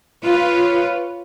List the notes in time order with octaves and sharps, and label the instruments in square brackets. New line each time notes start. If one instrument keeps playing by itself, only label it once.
[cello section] F4 B4 C#5